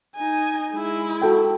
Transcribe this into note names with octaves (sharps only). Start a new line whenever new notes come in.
D#4 G#5
G#3 E4
F#4 A4 G5